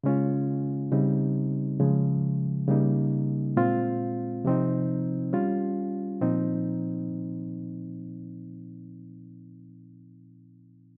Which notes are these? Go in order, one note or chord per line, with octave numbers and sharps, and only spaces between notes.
C#3 G#3 C#4 F4
C#3 G3 C4 D#4
C#3 F3 G#3
C#3 G3 A#3 D#4
A#2 G#3 C4 F4
C3 F3 C4 D#4
G3 C#4 F4
A#2 F3 C4 D#4